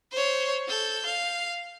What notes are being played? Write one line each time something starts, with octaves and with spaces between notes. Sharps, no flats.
C5 C#5
A4 G6
F5